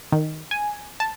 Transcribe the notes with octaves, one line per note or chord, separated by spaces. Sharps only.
D#3
G#5
A5